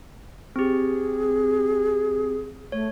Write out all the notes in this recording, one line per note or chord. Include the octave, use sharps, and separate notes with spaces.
C4 G4 G#4
A3 C#5